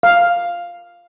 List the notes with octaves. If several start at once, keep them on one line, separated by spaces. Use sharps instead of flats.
F5